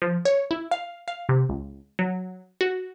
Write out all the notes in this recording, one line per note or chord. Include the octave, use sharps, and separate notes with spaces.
F3
C#5
E4
F5
F5
C3
C#2
F#3
F#4